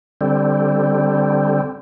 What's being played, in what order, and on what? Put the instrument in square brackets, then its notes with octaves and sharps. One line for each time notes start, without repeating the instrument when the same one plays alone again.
[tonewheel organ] D3 G3 C4